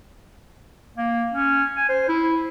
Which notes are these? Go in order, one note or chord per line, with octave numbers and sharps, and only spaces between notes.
A#3
C#4
G#5
C5
E4